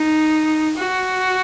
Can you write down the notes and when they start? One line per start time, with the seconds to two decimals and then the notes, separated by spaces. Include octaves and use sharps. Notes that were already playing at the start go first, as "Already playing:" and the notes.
Already playing: D#4
0.76 F#4